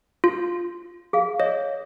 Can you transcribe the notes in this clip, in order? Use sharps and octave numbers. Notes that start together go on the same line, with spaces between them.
F4
G#4 F5
C#5 D#5